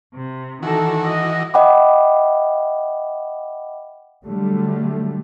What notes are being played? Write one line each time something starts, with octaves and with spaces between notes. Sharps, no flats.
C3
D#3 E3 F#4 A4
D#5
D#5 E5 F#5 G5 B5 D6
D3 F#3 G3 A3